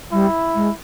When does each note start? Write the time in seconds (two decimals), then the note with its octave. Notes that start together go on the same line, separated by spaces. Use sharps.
0.12 G3 E4
0.55 G#3